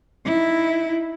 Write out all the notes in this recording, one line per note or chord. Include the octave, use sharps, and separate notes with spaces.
D#4 E4